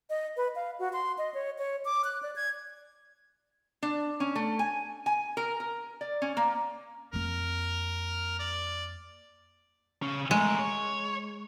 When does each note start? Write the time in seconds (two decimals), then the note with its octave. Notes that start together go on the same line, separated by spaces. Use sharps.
0.10 D#5
0.37 B4
0.56 F5
0.79 F#4
0.93 C6
1.18 D#5
1.34 C#5
1.58 C#5
1.85 D6
2.04 F#6
2.23 D5
2.36 G#6
3.83 D4
4.20 C#4
4.35 A3
4.59 G#5
5.06 G#5
5.37 A#4
5.60 A#4
6.01 D5
6.22 C#4
6.37 A#3
7.13 F2 A#3 A#4
8.39 D5
10.02 C#3 C#4
10.31 G#3 A3 A#4
10.59 C#5